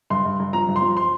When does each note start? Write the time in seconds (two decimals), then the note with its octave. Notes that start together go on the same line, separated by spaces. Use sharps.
0.10 G2 C6
0.25 G2
0.40 G2
0.53 F3 A#5
0.69 G2
0.76 C6
0.82 F3
0.97 C6